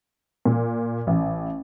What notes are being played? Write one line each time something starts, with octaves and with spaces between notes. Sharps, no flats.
A#2
A1